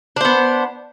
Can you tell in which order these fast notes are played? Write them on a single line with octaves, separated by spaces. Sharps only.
D4 C5 B3